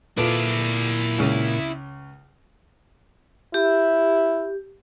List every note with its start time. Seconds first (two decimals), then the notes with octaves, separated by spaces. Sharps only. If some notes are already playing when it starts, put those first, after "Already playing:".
0.17 A#2 E4 F4 A4 B4 D5
1.18 C#2 C#3
3.54 E4 G4